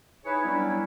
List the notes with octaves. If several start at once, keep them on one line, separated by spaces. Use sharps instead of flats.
D#4 E4 G#4 B4 C#5
F#3 G3 B3 C#4 D4 E4